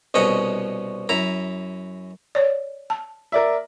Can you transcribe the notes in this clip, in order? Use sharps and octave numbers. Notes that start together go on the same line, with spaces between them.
C2 B2 C#4 D#5 F#5
F#2 E4 A#5
C#5 D5
A5
A#4 D5 E5